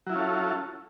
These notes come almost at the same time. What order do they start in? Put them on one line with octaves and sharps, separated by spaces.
F#3 E4 F4 C#4 A4